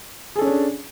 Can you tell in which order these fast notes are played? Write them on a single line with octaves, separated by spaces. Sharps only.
G#4 A4 C#4 C#5 D4